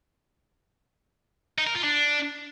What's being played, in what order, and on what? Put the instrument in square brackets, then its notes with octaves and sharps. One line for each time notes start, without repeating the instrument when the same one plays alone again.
[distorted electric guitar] D#4
A#4
F4
D4